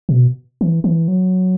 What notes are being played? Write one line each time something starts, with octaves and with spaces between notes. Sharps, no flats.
B2
E3
E3
F#3